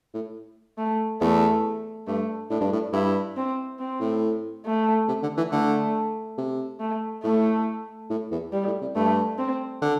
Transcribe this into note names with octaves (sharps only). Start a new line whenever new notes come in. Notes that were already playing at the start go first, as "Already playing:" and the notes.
A2
A3
E2 A3
G2 A3
A2 D4
G2
A2
G2 E4
C4
C4
A2
A3
C3
D3
E3
D3 A3
C3
A3
A2 A3
A2
E2
G3
A2
C3
G2 A3
C4
D3